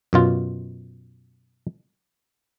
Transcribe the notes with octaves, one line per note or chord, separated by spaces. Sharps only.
F#2 B2 F4